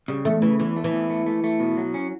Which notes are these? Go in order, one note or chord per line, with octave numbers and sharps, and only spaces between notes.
C#3 G3
E2 A3
C#3 E3
E2 E3
A3
E3
E2
A3
A3
A3
B2
F#3
C#4